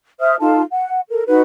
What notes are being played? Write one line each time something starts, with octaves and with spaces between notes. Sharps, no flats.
C5 E5 D#6 F6
D#4 F4 A4 A5
F#5
A4 A#4
D#4 F#4 B4